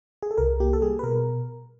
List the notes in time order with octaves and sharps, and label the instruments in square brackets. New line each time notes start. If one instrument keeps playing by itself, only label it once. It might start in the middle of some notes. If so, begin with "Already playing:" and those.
[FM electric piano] G#4
A4
C2 A#4
A#3 G4
A4
G3 G#4
B4
B2 A#4